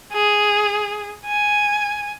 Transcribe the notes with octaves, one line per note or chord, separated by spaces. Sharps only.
G#4
G#5